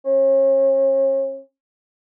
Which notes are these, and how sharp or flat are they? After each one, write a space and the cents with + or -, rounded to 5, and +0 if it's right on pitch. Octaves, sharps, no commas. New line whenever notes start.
C#4 -40